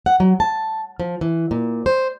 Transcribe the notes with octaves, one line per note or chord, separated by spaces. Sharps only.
F#5
F#3
A5
F3
E3
A#2
C5